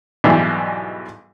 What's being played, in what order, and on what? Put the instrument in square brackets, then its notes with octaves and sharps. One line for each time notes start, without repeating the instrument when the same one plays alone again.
[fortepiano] B1 G#2 B2 E3 G3